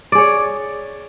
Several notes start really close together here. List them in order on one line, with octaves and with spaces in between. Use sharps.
D5 G#4 C#5